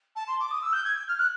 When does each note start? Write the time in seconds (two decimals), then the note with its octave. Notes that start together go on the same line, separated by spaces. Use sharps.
0.15 A5
0.27 C6
0.39 D6
0.50 D#6
0.62 E6
0.72 G6
0.84 G#6
0.95 G6
1.08 F6
1.19 F#6